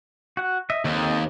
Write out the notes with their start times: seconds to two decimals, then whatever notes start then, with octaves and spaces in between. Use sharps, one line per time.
0.37 F#4 F#5
0.70 D#5 E5
0.85 D#2 C4 A4 D#5